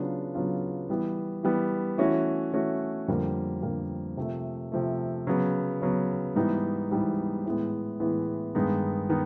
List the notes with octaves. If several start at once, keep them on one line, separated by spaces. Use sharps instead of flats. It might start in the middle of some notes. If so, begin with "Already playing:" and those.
Already playing: C#3 F#3 B3 D4 F4
C#3 F#3 B3 D4 F4
E3 G3 B3
E3 G3 B3
E3 A3 C#4 F#4
E3 A3 C#4 F#4
F2 D3 G3 A#3
F2 D3 G3 A#3
C3 F3 A3
C3 F3 A3
C#3 F#3 B3
C#3 F#3 B3
G#2 E3 G3 B3 D#4
G#2 E3 G3 B3 D#4
A2 E3 G#3 B3
A2 E3 G#3 B3
G2 D#3 G#3 B3 D#4
D#3 B3 D#4